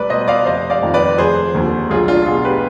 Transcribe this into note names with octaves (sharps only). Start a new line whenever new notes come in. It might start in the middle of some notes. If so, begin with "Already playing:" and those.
Already playing: C2 B4 D5
B2 C5 D#5
D5 F5
F1 C5 D#5
D5 F5
F2 D#3
B4 D5
F1 G#4 C5
D#2 D3 F3
B1 F4 G#4
D4 F4
B2 F4 G#4
G4 B4